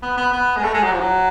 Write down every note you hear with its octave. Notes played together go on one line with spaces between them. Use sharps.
B3
B3
B3
G#3
A3
G#3
F#3
F3
F#3